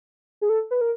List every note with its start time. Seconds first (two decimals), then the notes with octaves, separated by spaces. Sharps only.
0.41 G#4
0.49 A4
0.71 B4
0.81 A#4